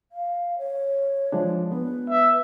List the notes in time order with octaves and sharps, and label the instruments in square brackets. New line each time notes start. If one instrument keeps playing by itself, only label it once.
[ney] F5
C#5
[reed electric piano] F3 G#3 D4
[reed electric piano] B3 [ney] B4
[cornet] E5